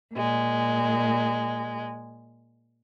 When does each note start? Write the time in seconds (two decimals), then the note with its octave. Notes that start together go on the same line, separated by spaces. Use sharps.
0.15 A#2 G#3